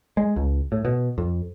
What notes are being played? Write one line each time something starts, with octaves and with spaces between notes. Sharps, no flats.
G#3
C#2
A2
B2
F2